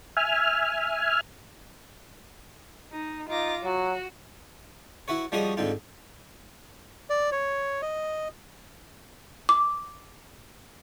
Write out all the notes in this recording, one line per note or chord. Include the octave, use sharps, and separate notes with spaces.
E5 G#5 F6
D#4
D#4 F4 D6 A#6
F#3 F#4
E4 F#4 B4 C#5
F3 G3 C#4 F#4 G#4 D#5
G#2 D3 C4 F4
D5
C#5
D#5
D6